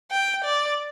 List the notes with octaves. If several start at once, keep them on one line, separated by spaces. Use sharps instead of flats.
G5
D5